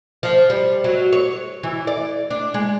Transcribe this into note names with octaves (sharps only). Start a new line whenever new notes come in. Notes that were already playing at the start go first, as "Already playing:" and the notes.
F3
G3
F#3
C#5
E3
D5
D4
G#3